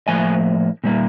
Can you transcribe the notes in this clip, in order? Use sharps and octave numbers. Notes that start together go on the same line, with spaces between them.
A2 F3 A#3 G#5
A#2 G3 A#3